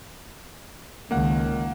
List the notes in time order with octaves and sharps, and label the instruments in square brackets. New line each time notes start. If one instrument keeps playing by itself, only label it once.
[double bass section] C#2 D#3 [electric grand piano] A#3 F#5